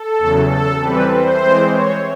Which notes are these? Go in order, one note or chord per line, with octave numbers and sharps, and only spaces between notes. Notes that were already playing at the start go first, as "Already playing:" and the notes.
Already playing: A4
E2 C#3 F#3
A4
E3 G3 C4 B4
C5
E3 G#3 C4
C#5